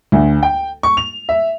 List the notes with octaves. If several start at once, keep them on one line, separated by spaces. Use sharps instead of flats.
D2
G5
C#6
F7
E5